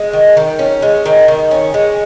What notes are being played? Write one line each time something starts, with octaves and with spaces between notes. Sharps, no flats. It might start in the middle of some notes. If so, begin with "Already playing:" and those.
Already playing: G#3
D#3
D#3
C#4
G#3
D#3
D#3
C#4
G#3